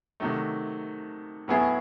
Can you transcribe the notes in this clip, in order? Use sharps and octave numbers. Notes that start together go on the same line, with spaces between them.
C3 D#3 F#3 A3
A2 F#3 B3 E4 G#4